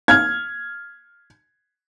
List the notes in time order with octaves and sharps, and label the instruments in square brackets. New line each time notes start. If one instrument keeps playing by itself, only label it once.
[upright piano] F6 G#6